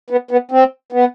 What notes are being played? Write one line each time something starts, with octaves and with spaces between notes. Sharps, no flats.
B3
B3
C4
B3